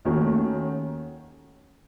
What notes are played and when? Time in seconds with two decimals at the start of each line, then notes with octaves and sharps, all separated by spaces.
0.05 D#2 D#3 A3 C#4 F#4